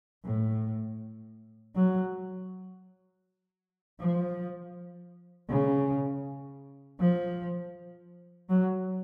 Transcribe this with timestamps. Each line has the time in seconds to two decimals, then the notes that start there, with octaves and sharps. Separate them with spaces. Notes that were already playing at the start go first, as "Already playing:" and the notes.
0.25 A2
1.75 F#3
4.00 F3
5.49 C#3
7.00 F3
8.49 F#3